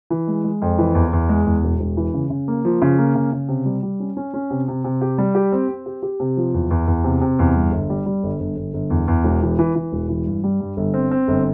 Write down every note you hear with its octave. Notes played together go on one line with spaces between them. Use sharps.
E3
G#3
G#3
F2
E3
E2
E2
G#3
E2
E1
E1
E3
C#3
C#3
A#3
F3
C#3
A#3
C#3
C#3
C3
G3
G3
C#4
C#4
C#4
C3
C3
C3
G4
G3
G4
C4
C4
G4
G4
C3
F3
E2
E2
E2
C3
C3
E2
G2
G1
G3
G3
G1
G1
G1
G1
E2
E2
E1
E3
E3
E3
E1
E3
G2
G3
G2
G1
C4
C4
G1